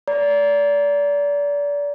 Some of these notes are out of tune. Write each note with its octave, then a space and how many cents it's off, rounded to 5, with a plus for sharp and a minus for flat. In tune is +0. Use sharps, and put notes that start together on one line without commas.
D5 -30 A#5 +5